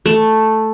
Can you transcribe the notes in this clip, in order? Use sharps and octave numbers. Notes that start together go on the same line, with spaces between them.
A3